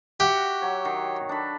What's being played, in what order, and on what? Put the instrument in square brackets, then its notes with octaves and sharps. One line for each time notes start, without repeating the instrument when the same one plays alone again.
[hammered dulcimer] F#4 E5 F#5 [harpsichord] G4
[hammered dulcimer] F#3 C#5
D#3
D4 A4 B5